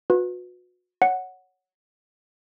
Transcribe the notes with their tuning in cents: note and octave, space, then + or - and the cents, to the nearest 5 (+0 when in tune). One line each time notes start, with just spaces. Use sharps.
F#4 -35 B4 +0
C#5 +5 F#5 +0